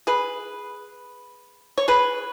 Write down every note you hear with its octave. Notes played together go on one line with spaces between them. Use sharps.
G#4 B4
C#5
G#4 B4